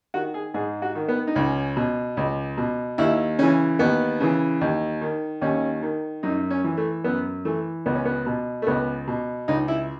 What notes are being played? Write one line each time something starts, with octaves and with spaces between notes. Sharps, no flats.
D#3 F#4
G#4
G#2 G#4
F#4
D#3
B3
D#4
C#2 C#4
B2
C#2
B2
D#2 E4
C#3 E3 C#4
D#2 B3
C#3 E3
D#2
D#3
D#2 C#4
D#3
F#2 D#4
C#4
E3
A3
F#2 B3
E3 A3
C#2 B3
C#4
B3
B2
A3
C#2 B3
B2
C#2 D#4
E4